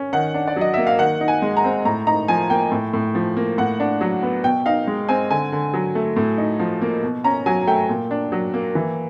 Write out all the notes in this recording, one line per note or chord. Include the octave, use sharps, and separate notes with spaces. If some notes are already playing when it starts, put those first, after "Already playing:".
Already playing: C#4
D#3 F#5
D4
D5
F#3 D#5
A#3 E5
F5
D#3 F#5
D#4
G#5
G#3
A#5
C4
A2 A#5
D#4 A#5
F3 G#5
A#3 G5
A2
A2
F3
A#3
A2 F#5
D4
F#3
B3
B2 G5
D#4 F5
G#3
C4 G#5
D3 G#5
D3
F#3
A3
A2
D#4
F3
A#3
B2
C#4 A#5
F#3 G#5
A3 G5
A#2
D4
F#3
A#3
E3